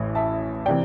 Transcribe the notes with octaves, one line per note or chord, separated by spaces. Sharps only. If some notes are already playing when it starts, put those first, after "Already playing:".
Already playing: A1 A2 E3
E5 A5
C3 E3 D5 G5